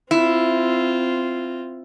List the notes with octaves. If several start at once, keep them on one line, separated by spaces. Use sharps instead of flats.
C4 E4 F4